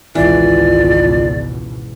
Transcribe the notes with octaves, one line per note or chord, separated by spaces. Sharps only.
G#1 C#2 B2 E3 F4 D5